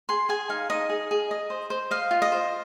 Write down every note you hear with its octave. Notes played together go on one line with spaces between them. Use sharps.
G#4 C6
G#4 G#5
D#4 F5
D#4 D#5
G#4
G#4
D#5
C5
C5
D#5 F5
F4
D#5
C5